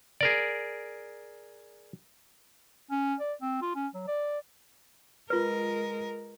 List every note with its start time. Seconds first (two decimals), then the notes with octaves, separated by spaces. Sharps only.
0.21 G#4 A#4 D5
2.91 C#4
3.20 D5
3.42 C4
3.62 F4
3.75 C#4
3.95 F#3
4.08 D5
5.30 G#3 F4 A#4 B4